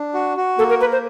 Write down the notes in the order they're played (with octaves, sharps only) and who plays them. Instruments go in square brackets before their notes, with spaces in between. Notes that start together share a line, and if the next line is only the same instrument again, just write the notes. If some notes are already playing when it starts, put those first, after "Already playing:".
Already playing: [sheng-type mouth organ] D4
F#4
F#4
[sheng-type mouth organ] A#3 [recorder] A4
[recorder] A#4
[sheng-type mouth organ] A#4 [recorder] B4
[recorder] C5